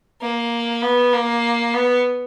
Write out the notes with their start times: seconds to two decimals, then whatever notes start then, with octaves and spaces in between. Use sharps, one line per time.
0.22 A#3
0.82 B3
1.13 A#3
1.74 B3